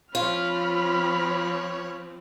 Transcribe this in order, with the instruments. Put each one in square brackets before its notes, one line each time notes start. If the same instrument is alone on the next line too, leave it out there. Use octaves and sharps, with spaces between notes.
[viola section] F3 C4 [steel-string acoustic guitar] F4 [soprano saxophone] C#5 [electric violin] B5 F6